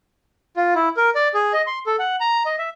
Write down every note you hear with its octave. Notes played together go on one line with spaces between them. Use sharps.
F4
E4
A#4
D5
G#4
D#5
C6
A4
F#5
A#5
D#5
E5